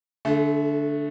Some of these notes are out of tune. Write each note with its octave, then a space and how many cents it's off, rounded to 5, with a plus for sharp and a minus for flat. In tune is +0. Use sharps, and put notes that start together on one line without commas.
D3 -5 A3 +0 A4 -45